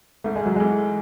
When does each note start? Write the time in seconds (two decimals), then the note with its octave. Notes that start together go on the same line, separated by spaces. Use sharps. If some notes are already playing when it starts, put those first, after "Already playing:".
0.24 G#2 A3
0.36 G#3
0.46 F#3
0.56 E3 G#3 A3